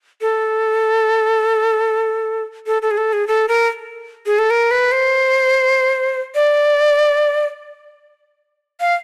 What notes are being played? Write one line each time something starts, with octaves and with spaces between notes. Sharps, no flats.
A4
A4
A4
G#4
A4
G#4
A4
A#4
G#4
A4
A#4
B4
C5
D5
F5